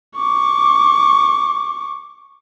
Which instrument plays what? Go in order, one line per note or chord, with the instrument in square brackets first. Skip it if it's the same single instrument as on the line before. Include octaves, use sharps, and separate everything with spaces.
[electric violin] C#6 D6